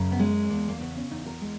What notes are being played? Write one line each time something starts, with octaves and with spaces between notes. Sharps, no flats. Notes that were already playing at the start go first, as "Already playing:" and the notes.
Already playing: F#2 C#3
B3
G#3 C#4
E2 A#3
A#3
C#3 B3
C#4
E2 D#4
A#4
G#3